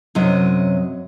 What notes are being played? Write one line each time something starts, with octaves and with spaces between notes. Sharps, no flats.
F#2 C3 F#3 D#5